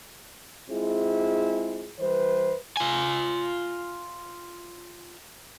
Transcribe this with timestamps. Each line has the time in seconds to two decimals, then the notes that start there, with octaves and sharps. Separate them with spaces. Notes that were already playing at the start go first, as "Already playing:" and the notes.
0.69 G#3 C4 E4 F4 G#4
1.99 E3 G3 B4 C5
2.77 F4 G#5